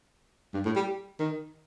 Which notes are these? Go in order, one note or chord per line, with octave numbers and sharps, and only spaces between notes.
G2
A2
G3
D#3